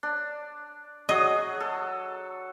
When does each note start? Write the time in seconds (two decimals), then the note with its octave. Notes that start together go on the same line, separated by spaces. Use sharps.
0.03 D4
1.09 F#3 F#4 G#4 D#5
1.60 A4